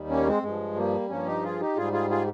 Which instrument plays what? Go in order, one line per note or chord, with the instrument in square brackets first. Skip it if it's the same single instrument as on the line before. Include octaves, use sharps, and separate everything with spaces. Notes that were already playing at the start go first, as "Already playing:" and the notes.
Already playing: [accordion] D#2 D#3 G3
A#3 C#4
G#3 C4
G2 F3 G#3
G3 A#3
G2 F3 A#3 C#4
D#4 G4
F4 G#4
D#4 G4
G#2 G3 F4 G#4
F4 G#4
F4 G#4